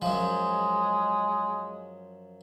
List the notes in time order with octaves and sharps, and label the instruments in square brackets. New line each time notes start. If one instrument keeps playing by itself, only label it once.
[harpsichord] F#2 F3 [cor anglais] G#3